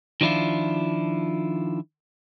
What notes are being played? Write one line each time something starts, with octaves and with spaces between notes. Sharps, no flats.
D#3 F3 D4 E4 F4